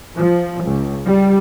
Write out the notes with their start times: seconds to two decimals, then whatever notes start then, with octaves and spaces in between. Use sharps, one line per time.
0.17 F3
0.65 C#2
1.06 G3